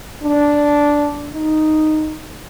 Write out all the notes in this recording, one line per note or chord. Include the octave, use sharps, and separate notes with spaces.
D4
D#4